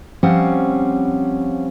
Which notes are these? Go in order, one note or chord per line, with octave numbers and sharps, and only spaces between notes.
F3 G3 C4 C#4 F5 F#5